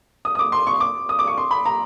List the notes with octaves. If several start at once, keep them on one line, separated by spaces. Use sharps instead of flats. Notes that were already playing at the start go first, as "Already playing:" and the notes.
D#6
D#6
D6
C6
C#6
D6
D#6
D6
C#6
C6
B5
A#5